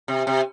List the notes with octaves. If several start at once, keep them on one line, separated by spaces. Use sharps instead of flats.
C3
C3